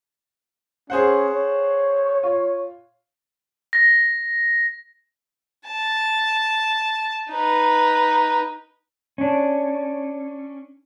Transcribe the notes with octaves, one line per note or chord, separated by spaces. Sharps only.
C#4 G#4 C5 F#5
C#5
F4
A#6
A5
D#4 B4
C#4 D4